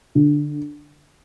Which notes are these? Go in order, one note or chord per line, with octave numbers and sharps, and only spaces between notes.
D3